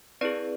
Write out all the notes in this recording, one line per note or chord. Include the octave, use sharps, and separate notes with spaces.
C4 E4 G#4 B4 D5